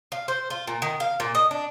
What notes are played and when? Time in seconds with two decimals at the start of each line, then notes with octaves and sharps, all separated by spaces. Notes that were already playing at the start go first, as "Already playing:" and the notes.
0.12 F5
0.28 C5
0.50 F4
0.67 A#2
0.82 D#3
1.00 F5
1.20 A#2
1.35 D#5
1.51 D4